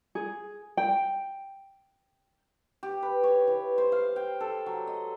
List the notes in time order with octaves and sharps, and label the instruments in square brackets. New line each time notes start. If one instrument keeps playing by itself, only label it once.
[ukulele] G#4
G5
[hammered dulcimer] G4
B4
C#5
E3
C5
F5
G5
A4
F#3
D#5